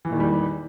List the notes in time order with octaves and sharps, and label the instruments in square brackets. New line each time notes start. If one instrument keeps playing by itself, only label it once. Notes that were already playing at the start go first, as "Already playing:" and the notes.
[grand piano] E3
A#2
D#3
E2
G3